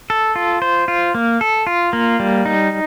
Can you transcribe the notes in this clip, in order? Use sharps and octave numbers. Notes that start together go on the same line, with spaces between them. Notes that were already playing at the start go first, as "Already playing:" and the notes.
A4
F4
C5
F4
A#3
A4
F4
A#3
G3
D#4